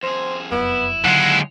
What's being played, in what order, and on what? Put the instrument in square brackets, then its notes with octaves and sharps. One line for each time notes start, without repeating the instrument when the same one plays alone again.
[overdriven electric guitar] F2 G#4 [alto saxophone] C5
[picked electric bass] F1 F#2 [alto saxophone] B3 [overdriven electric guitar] E4
[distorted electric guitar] D#2 G#3 [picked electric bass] D3 F#3 [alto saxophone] F#5